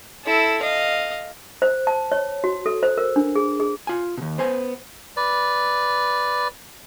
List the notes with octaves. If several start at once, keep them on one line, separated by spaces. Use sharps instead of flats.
E4 A4
D#5 F5
C5
A5
C#5
F#4
A4
C5
A#4
D4
G#4
G#4
F4 G#5
D#2 B2
B3 C5 G#5
B4 D5